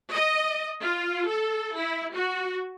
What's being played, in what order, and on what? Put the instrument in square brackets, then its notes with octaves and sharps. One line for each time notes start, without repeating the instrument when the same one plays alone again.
[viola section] D#5
F4
A4
E4
F#4